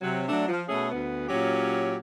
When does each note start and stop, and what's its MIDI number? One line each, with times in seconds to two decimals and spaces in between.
0.01 0.24 48
0.01 0.24 54
0.28 0.46 54
0.28 0.46 57
0.28 0.46 62
0.48 0.63 53
0.69 0.89 47
0.69 0.89 57
0.69 0.89 61
0.69 0.89 68
0.91 1.26 38
0.91 1.26 59
1.29 1.96 46
1.29 1.96 54
1.29 1.96 61
1.29 1.96 67